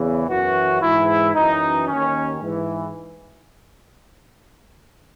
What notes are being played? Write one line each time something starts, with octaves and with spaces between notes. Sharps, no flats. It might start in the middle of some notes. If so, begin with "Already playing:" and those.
Already playing: E2 C#3 E3
F#2 E3 F#4
G#2 E3 E4
F#2 E3 D#4
D#2 D#3 C#4
G#2 E3